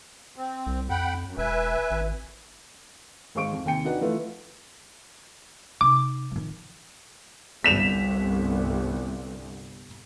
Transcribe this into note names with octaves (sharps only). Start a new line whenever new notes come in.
C4
C2
F2 F#5 G5 B5
F#2
E1 B4 E5 G#5
G#1
G#1 G#3 C5 F5 C#6 D7
F2
D#2 C3 G5 C#7
D4 D#4 F#4 B4 F#5
E3 F3 A3 F4 B4
C3 D#4 D6
D#3 F3
G1 C2 B6 E7 F7